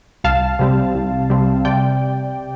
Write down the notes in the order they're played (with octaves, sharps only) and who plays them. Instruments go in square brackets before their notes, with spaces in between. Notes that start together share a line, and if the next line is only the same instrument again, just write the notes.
[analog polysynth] C2 F5 A5
C3 G3 C4
C2
C3 G3 C4
C3 D5 G5